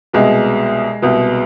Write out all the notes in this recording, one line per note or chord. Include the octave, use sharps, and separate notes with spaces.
C2 B2 G#3
C2 B2